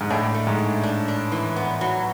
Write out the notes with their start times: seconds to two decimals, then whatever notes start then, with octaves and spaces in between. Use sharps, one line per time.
0.01 G#2
0.10 A2 D4
0.34 A3
0.47 G#2
0.58 D4
0.83 D4
1.08 D4
1.32 E3
1.56 B3
1.81 F#3